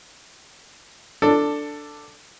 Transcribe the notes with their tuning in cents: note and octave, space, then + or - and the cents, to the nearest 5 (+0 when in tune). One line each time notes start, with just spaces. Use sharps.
D4 +0 A4 +15